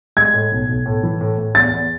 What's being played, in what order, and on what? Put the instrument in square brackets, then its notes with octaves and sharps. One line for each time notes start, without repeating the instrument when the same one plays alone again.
[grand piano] G#3 [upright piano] G#6
[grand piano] A2
B1
B1
A2
E3
A2
A2
[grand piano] E2 [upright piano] A6
[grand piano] E2